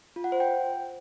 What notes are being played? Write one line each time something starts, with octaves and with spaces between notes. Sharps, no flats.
F4
F#5
C5
G5